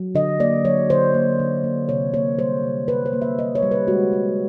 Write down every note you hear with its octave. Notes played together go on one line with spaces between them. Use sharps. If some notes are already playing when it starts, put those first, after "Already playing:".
Already playing: F#3
D3 D#5
A#3 D5
F#3 C#5
D3 C5
A#3
D3
A#3
C3 C#5
A#3 C#5
G3 C5
C3
C3 B4
C5
A#3
E5
G3 D#5
C#5
G3
B4
G#3 F#4
G#3